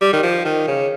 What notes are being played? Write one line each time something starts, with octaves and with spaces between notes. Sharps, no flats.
G3
D#3
F3
D#3
C#3